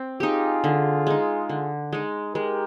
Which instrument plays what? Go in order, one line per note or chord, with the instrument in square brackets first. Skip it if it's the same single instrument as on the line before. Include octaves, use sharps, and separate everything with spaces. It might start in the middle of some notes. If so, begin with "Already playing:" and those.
Already playing: [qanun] C4
[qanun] D#4 G4 [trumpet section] F4 G#4
[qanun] D3
G#3 D#4
D3
G#3 D#4
[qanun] G#3 [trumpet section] G4 A#4